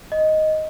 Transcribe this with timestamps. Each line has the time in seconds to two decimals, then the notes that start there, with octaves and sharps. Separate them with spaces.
0.12 D#5